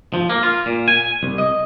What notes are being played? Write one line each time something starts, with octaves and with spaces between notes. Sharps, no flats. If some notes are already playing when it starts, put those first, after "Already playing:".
F3
A#3
F4
A#2
G#5
C2
D#5